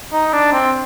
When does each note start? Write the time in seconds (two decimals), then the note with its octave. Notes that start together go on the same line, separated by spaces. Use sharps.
0.13 D#4
0.33 D4
0.53 C4